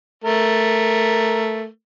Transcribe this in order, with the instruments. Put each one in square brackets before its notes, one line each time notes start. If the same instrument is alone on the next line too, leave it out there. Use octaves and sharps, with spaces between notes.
[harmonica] A3 A#4